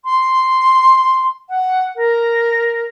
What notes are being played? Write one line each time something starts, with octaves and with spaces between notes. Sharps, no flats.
C6
F#5
A#4